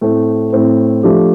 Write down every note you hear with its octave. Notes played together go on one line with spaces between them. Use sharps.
A2 A3 C4
A2 A3 C4
F3 A3 D4 G4